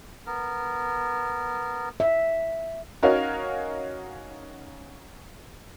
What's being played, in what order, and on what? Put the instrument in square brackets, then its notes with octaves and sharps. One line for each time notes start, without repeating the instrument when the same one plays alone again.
[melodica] B3 A#4
[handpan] E5
[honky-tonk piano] C#4 D#4 F#4 A#4 C#5 F5